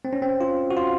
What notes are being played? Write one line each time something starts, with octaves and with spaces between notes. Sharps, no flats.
C4
C#4
C4
F4
F#4
F4